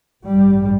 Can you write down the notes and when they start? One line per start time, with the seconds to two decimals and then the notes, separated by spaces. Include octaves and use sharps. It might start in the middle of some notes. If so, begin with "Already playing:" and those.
0.24 A1 G2 G3